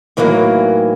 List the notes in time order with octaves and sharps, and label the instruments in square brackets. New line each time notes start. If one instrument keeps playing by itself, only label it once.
[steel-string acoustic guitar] A2 D#3 E3 F#3 A3 A#3